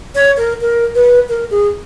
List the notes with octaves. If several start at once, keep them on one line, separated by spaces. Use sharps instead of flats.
C#5
A#4
A#4
B4
A#4
G#4